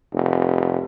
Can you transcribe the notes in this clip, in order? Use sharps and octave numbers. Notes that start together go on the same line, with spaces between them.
F1